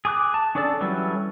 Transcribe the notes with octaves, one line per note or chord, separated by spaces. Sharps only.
G#4 D6 F#6
A5
C#4 D4 G#4 A4 D5
E3 F#3 G3 C#4 A4